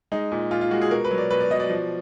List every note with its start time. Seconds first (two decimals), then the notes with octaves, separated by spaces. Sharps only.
0.12 G#3 D#4
0.32 A#2
0.51 A#2 F4
0.61 F4
0.71 G#3 F#4
0.82 G#4
0.91 B2 A#4
1.04 B4
1.11 F#3
1.18 D5
1.30 B2 B4
1.40 D5
1.50 B2 D#5
1.60 D5
1.70 F3